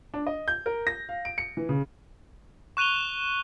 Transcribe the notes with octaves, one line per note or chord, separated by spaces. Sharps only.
D4
D#5
G6
A#4
A#6
F5
D7
C#7
E3
C#3
C#6 F#6 D#7 F7 G7